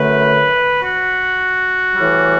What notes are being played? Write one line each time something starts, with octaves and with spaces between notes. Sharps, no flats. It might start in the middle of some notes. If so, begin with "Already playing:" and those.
Already playing: F#2 D3 A3 B4
F#4
A2 E3 G3